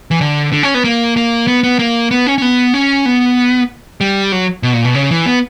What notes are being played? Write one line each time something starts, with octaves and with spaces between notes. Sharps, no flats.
E3
D3
D3
C#4
B3
A#3
A#3
B3
B3
A#3
B3
C#4
C#4
B3
C#4
B3
G3
F#3
B2
A#2
B2
C#3
E3
B3